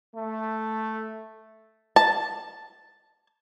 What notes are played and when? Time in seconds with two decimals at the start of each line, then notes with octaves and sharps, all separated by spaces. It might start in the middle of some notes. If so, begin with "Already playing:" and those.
0.13 A3
1.96 A5